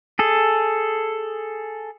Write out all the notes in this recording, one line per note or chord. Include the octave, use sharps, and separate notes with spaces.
G#4 A4